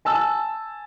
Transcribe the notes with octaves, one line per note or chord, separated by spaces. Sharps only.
G#5 A5 E6